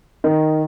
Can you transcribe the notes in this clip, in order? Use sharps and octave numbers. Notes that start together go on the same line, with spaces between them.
D#3